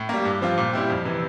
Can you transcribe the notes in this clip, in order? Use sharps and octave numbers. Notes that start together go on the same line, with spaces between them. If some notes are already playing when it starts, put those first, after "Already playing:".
Already playing: A2
G3 A#3
G2
F3 C4 F4
A#2
G3 C4 E4 G4
F2
C3 E3